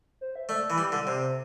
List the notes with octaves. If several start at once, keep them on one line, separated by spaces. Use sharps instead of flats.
C5
E5
A3 D5
E3
G3
D3
C3 C5